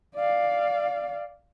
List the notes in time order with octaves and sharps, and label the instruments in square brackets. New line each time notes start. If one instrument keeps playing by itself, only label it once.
[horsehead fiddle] D5 F5